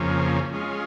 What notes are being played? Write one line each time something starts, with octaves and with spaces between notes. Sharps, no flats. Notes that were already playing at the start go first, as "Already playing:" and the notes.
Already playing: F2 C#3 F3 A#3 C#4
G#3 C#4 F4